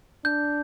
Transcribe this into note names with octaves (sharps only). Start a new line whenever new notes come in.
D4 G6